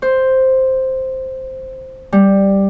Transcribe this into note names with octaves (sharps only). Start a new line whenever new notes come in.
C5
G3